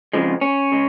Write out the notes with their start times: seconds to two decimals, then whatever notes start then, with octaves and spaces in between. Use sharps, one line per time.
0.13 F2 C#3 F3 G#3
0.41 C#4
0.72 C#3 G#3